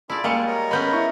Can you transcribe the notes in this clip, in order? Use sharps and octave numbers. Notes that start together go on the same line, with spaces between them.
D4 E4 F4 G#4 D5
G3 G#3 A#3 F4 G#5 C#6 C#7
A#4 C#5 D#5
G#3 B3 C#4 B5 G6
E4 C#6